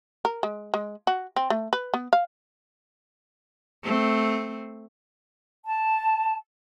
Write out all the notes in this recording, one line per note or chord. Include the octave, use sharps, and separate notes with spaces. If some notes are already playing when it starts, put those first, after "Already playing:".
A#4
G#3
G#3
F#4
C4
A3
B4
B3
F5
A3 C4
A5